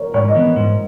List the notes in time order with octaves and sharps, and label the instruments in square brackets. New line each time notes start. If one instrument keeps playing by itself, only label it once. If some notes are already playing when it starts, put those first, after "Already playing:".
Already playing: [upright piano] A#4 C#5
[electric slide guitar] G#2 [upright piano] C#5
[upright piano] D#5
[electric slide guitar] E3 B3
G#2